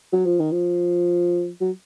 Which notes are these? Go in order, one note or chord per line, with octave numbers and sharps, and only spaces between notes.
F#3
F3
D#3
F3
F#3